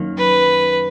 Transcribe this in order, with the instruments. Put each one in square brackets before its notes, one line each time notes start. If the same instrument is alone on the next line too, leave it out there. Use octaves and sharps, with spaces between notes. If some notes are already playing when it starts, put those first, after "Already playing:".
Already playing: [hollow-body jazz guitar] F#2 D#3 A#3
[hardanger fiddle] B4